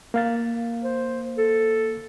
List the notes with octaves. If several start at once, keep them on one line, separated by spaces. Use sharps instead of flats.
A#3 F5 A6
C5
A4